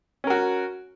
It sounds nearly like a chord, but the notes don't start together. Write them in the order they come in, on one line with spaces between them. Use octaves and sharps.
C#4 A#4 F#4